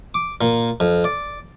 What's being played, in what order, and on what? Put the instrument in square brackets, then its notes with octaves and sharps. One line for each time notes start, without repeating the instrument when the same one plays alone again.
[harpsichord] D6
A#2
F2
D5